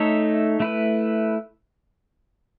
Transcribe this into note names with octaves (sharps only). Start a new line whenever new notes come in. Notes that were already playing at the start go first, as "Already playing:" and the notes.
Already playing: A3 D#4 A4 C#5 E5
A3 E4 B4